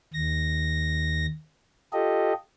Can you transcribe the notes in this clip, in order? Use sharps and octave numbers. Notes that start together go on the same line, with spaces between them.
D#2 A#6
F4 G4 A4 D#5